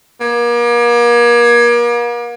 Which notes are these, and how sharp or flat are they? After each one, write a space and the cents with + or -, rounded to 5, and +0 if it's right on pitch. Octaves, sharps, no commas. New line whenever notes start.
A#3 +40